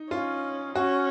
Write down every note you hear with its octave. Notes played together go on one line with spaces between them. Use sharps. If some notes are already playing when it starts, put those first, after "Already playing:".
Already playing: D#4
C#4 F4
C#4 F#4